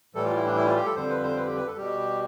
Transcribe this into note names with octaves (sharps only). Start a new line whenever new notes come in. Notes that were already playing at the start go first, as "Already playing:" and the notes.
A2 E3 G3 A4
F4
E4
D4
E4
F4
G4
A4
F2 D3 G3 C5
B4
C5
B4
G4
B4
A4
B2 G3 G4